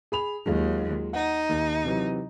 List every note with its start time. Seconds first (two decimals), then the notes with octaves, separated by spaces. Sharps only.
0.12 G#4 B5 F7
0.46 D#2 F#3 G#3 F4
1.13 D#4 F#5
1.49 D#2
1.84 C3 E3 F#3